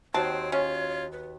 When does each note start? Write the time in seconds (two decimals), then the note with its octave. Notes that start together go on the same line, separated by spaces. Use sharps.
0.14 D#2 C4 F#4 C5 C#5 A5
0.52 C#4 F4
1.12 B4